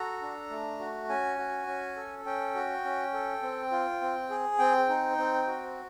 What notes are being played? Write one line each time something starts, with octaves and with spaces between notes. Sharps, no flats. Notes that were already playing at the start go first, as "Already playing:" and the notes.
Already playing: F#4 A4 A#5
D4
A3
F#4
C#4 G#5
F#4
C#4
A4
C#4 G5
F#4
C#4
A4
C4
F4
C4
G#4
C4 G5
D#4
C4
F#4